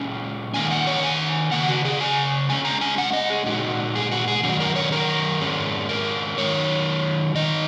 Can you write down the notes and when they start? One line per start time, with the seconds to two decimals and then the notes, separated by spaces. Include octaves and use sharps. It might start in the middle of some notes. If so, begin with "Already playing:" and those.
Already playing: A#2 G#3 C#4 G#5
0.54 D#3 A#3 D#4 G#5
0.71 F#5
0.87 C#5
1.03 G#5
1.52 C#3 A#3 F#5
1.69 F#4
1.85 G#4
2.01 G#5
2.49 A#2 G#3 C#4 G#5
2.65 A#5
2.81 G#5
2.98 F#5
3.13 D#5
3.30 G#4
3.46 A#2 G#3 D#4 F#4
3.95 G#4
4.12 F#4
4.28 G#4
4.43 F#2 D#3 F#3 C#4 F#4
4.60 A#4
4.76 C#5
4.92 A#4
5.41 G#2 G#3 C#4
5.89 A#4
6.38 D#3 F#3 D#4 C#5
7.35 D#3 G#3 D#4 D#5